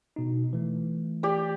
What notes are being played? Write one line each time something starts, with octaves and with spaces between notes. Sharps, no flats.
B2 D#4
E3 A3
G4 D5